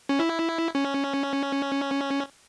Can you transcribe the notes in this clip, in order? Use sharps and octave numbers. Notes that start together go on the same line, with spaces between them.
C#4
E4
C#4